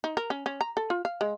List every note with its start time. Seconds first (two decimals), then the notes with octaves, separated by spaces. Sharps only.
0.04 D#4
0.17 A#4
0.30 C#4
0.46 C#4
0.61 A#5
0.77 A4
0.90 F4
1.05 F5
1.21 G#3